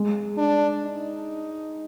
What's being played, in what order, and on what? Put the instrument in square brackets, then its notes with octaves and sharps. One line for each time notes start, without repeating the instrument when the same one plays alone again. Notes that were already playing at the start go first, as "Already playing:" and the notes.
Already playing: [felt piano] G#3
[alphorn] D4
D#4